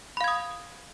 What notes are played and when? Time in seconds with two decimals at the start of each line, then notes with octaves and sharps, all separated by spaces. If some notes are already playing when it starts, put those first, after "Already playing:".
0.17 B5
0.21 F5
0.24 G#6
0.28 D#6